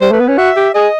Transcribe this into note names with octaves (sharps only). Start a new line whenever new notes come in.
G3 C5
A3 B4
B3
C#4 B4
F#4 E5
G4
G#4 D#5